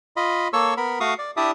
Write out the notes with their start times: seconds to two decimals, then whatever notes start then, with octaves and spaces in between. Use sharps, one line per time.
0.16 F4 D#5 B5
0.53 A#3 A4 C#5 C#6 E6
0.77 B3 A#4 B5
1.00 A3 F#4 F5 C#6 D#6
1.19 D5
1.37 D4 E4 G4 D5 E5 D#6